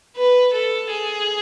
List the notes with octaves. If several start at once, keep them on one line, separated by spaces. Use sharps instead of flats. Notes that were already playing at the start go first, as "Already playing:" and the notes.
B4
A4
G#4